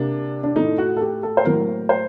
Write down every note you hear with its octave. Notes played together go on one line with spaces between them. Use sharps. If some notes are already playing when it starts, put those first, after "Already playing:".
Already playing: C3 A#3 D4
D4
A2 A3 D#4
F#4
A4
G4
A4
C5
A2 F#3 A#3 A#4
C5